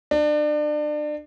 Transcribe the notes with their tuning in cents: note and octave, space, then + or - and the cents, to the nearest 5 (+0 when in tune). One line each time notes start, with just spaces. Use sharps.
D4 +30